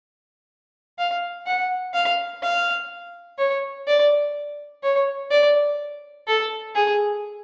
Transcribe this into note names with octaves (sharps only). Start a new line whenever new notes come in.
F5
F#5
F5
F5
C#5
D5
C#5
D5
A4
G#4